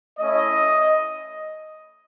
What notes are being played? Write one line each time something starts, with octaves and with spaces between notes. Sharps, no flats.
A3 C#4 E4 D#5